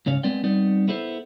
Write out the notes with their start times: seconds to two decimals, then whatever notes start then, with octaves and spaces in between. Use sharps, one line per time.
0.06 G#2 C#3 C#5 F5
0.23 G#3 B3 C4 D5 G5
0.44 G3 B3 C4 D#4 D5
0.88 B3 E4 A4 C5